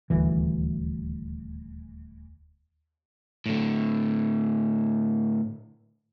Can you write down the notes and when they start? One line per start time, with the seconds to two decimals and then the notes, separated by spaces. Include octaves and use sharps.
0.10 D#1 D2 E3
3.46 A2 D3